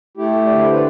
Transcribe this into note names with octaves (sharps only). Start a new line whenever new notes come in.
A3 E4 G4
D3 D5
C5
B4